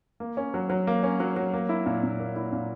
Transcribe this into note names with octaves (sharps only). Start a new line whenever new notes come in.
A#3
C#4
F#3
F#3
A#3
C#4
F#3
F#3
A#3
E4
A#2
A#2
A#3
E4
A#2